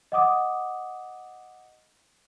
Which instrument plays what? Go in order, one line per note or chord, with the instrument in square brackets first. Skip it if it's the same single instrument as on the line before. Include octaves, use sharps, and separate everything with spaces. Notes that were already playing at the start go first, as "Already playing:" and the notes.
[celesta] D#5 F#5 D6 D#6